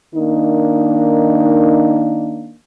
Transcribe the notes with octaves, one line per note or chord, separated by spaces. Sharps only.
D#3 A#3 D4 D#4